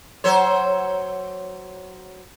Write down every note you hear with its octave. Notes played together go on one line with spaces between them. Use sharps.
F#3 C5 C#5